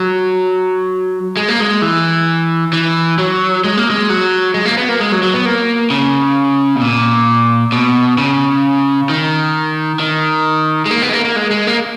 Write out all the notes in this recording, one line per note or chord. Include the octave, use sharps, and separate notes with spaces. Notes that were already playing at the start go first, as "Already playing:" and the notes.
Already playing: F#3
G#3
A#3
G#3
E3
E3
F#3
G#3
A#3
G#3
F#3
G#3
A#3
B3
A#3
G#3
F#3
F#3
B3
A#3
C#3
B2
A#2
B2
C#3
D#3
D#3
G#3
A#3
B3
G#3
A#3
A#3
G#3
G#3
A#3